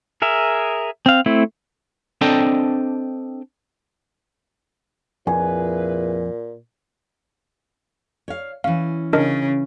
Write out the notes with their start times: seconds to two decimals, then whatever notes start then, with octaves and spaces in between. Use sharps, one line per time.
0.22 G#4 A#4 E5
1.06 C4 F5
1.26 A3 C4 E4
2.21 C4 D4 A4 D5 D#5 G5
5.27 F2 A#2 E4 G#4 B4 G#5
8.28 C#5 F5
8.64 E3 C#4 F5
9.13 C#3 D4 A#4 D#5